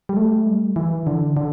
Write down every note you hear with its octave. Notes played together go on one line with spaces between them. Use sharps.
G3
A3
G3
E3
D3
D3